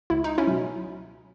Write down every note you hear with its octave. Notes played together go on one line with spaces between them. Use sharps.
C#2 E4
D#4
C#4 E4
B2 F#3